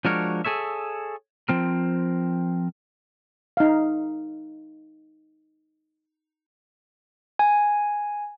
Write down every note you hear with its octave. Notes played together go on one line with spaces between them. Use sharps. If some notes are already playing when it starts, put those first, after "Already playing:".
F3 G#3 D4 F#4 A#4 C#5
G#4 A4 C#5 E5
F3 C4 A#4
D#4 F5
G#5